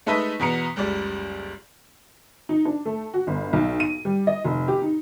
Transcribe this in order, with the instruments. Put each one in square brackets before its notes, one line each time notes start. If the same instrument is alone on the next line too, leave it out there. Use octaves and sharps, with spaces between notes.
[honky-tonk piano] G#3 A3 D#4 B4 D#5 E5
E2 B2 B3 A#5 C#7
F#1 C#2 G3 D5
D#4
D4
A3
F#4
G1
B1
D#7
G3
D#5
F1
G4
D#4